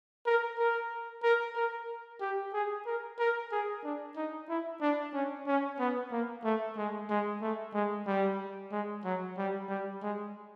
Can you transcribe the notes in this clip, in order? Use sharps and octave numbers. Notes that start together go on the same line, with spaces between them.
A#4
A#4
A#4
A#4
G4
G#4
A#4
A#4
G#4
D4
D#4
E4
D4
C#4
C#4
B3
A#3
A3
G#3
G#3
A3
G#3
G3
G#3
F#3
G3
G3
G#3